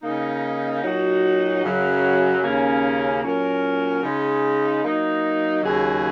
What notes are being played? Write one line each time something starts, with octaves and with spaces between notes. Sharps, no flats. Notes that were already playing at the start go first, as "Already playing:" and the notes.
C#3 A#3 D#4
A#2 F#3 D#4 F#4
F#2 C#3 F#3
D#2 C#3 A#3 C#4
A#2 F#3 C#4 A#4
C#3 G#3 D#4
F#3 A#3 D#4
D#2 C#3 F#3 D#4 G#4